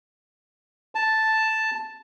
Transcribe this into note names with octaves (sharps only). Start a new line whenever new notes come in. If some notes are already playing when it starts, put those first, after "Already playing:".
A5